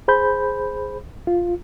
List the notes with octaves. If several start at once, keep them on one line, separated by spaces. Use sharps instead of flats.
G#4 C5 B5 G6
F4